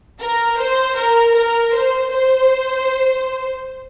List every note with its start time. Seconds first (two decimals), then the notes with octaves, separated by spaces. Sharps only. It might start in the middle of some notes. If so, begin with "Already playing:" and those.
0.19 A#4
0.57 C5
0.96 A#4
1.34 A#4
1.72 C5
2.11 C5